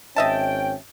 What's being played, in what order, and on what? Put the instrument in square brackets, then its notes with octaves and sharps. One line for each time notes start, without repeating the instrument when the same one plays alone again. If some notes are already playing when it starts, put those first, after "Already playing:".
[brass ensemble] G#1 C#4 G5 [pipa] D#5 E5 A5